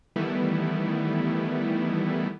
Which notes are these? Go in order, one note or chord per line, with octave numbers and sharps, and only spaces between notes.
D#3 E3 G3 A3 B3 E4